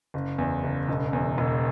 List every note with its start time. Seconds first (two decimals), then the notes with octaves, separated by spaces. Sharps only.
0.14 F#1
0.38 E2
0.63 F#1
0.89 E1
1.13 E2
1.38 E1